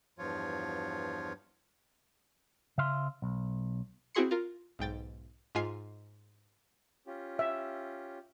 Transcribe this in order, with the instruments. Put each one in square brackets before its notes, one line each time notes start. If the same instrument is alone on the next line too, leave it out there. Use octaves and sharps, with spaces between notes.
[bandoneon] E2 G2 F3 F4 C#5
[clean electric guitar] C#3 E5 F5 C6
B1
[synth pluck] C4 E4 F#4 G#4 C6 C#7
F4 A#4
B1 G#2 G5 A6
G#2 G#3 F4 G#5 F6 C7
[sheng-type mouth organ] C#4 F4 G4
[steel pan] E5